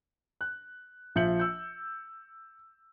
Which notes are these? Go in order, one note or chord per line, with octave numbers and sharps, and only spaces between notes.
F#6
A#1 F3 E5 G6 C#7 F#7
E6 G6